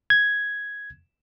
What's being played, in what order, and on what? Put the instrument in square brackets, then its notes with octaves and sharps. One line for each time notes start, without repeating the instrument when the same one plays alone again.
[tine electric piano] G#6